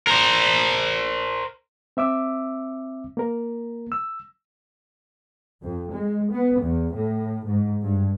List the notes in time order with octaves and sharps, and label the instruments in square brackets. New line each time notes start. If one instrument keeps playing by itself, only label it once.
[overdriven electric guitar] A#4 C5
[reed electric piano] C4 E5 D6 E6
A#3 A#4
E6
[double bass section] F2
G#3
B3
E2
A2
G#2
G2